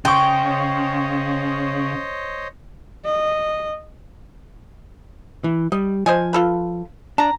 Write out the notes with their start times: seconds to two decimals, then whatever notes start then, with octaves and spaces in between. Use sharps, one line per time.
0.05 C#3 C5 C#5 D#5 G5 C6 C#6
3.05 D#5
5.44 E3
5.72 G3 D#5
6.06 F3 C5 D#5 G#5
6.33 F4 A4 B4
7.18 D4 A5 A#5